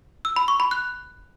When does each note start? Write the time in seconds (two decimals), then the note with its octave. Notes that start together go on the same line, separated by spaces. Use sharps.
0.25 E6
0.36 B5
0.48 C#6
0.60 B5
0.71 F#6